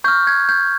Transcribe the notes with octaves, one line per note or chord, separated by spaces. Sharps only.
C#6 F6 G6
G#6
G6